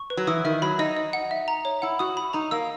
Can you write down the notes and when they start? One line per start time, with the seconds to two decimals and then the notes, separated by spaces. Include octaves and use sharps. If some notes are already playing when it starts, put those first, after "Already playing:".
Already playing: C#6
0.10 B4
0.17 F#3
0.27 E3 D#6
0.45 D#3 E5
0.62 F#3 B5
0.79 D#4 D#5
0.97 D#5
1.13 F#5
1.31 E5
1.48 A#5
1.65 C#5
1.82 E4 F#5
1.99 F#4 D#6
2.17 B5
2.33 D#4 A#5
2.51 A#3 E6